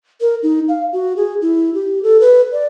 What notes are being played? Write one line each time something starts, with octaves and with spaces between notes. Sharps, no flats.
A#4
D#4
F5
F#4
G#4
E4
G4
A4
B4
D5